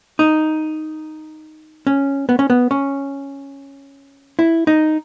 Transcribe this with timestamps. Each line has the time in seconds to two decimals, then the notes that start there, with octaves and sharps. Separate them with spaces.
0.19 D#4
1.87 C#4
2.29 B3
2.39 C#4
2.50 B3
2.71 C#4
4.39 E4
4.67 D#4